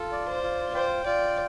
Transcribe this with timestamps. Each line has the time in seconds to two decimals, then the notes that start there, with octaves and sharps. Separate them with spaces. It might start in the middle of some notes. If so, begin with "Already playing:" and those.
Already playing: F4 A4
0.12 D5
0.28 C5
0.43 F4
0.74 C5 G5
1.06 F4 D5